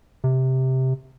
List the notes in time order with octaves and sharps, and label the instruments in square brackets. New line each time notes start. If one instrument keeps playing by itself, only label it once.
[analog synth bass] C3